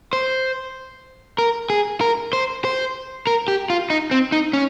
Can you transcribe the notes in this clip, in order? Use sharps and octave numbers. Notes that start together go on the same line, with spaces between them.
C5
A#4
G#4
A#4
C5
C5
A#4
G4
F4
D#4
C4
D#4
C#4